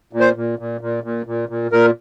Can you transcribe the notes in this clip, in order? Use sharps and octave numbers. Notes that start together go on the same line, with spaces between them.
A#2
C5
A#2
A#2
A#2
A#2
A#2
A#2
A#2 A#4